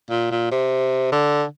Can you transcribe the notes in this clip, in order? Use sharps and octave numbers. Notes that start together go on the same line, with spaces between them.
A#2
A#2
C3
D3